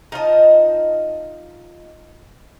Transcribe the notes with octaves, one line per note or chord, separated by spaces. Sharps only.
D#4 F4 D#5 A5